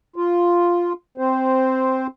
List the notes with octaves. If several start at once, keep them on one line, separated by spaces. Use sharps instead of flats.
F4
C4 C5